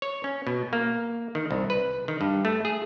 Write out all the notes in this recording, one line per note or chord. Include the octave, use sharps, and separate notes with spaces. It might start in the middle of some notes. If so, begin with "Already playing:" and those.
C#5
C#4
B2
A#3
D#3
C2
B4
D#3
G2
A3
G#4